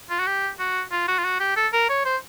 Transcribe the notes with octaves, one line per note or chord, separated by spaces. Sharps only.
F4
F#4
G4
F#4
F4
F#4
F4
F#4
G4
A4
A#4
C#5
C5